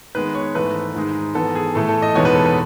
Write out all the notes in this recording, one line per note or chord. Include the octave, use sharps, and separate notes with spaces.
D#3 G#3 B3 B4
C#5
G#2 E3 A3 B4
G#2 D#3 G#3 D#4
G#2 E3 B3 A4
G#4
A2 E3 A3 A4
A4
D#5
E2 B2 G#3 B3 D#4 C#5
B4
A4
B4